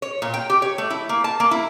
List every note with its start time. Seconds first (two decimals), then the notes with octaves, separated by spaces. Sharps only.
0.02 C#5
0.22 A#2
0.34 G5
0.50 G4
0.62 C#5
0.78 A3
0.90 E4
1.09 A#3
1.24 A5
1.40 A#3
1.51 E4